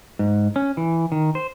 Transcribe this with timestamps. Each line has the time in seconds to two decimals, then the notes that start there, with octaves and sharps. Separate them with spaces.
0.19 G#2
0.56 C#4
0.77 E3
1.12 D#3
1.35 C5